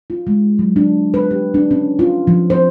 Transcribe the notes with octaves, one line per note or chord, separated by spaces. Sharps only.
F4
G#3
F#3
D4
B4
G4
D4
C#4
F4
F3
C5